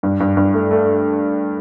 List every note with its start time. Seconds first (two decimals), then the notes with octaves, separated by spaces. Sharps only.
0.03 G2
0.20 G2
0.37 G2
0.54 A3
0.71 A3